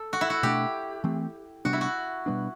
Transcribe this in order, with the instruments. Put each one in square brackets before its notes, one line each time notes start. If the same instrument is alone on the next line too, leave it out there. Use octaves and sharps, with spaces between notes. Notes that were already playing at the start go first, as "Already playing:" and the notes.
Already playing: [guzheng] A4
F#4
E4
F#4
[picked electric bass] B2 A3 D4 [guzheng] G4
[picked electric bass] E3 A3 C4
[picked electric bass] C3 G3 B3 D4 [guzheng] F#4
[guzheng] E4
F#4
[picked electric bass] B2 G3 B3 D4